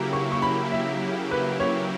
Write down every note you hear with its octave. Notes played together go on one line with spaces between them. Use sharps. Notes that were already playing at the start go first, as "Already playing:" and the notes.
Already playing: C#3 F#3 A#3 E4 G4 A#5
C#6
C#6
B5
E5
B4
C#5